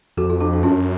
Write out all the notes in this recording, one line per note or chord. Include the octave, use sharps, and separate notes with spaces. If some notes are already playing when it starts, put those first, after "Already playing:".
F2 F#4 A4
F4
D4 F#4
D4
F#2 C#4 F4